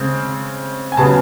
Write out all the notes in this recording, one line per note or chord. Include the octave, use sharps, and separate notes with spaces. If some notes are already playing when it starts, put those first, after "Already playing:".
Already playing: C#3 G#3 C4
G#5
C#3 F#3 B3 A5